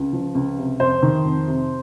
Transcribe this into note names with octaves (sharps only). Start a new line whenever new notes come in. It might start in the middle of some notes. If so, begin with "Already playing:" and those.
Already playing: C#2
F3
C#2
C3
F2 C5
D#3
F2
C3